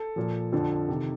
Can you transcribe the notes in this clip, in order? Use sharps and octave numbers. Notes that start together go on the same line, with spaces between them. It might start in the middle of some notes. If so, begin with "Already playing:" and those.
Already playing: A4
A#2 F3
F2 D3 F3 A4
C3 D#3